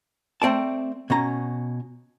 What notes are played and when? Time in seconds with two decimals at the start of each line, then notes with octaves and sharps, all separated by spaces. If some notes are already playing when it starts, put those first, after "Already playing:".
0.42 A3 C4 D5 A5
1.10 B2 C#4 A#5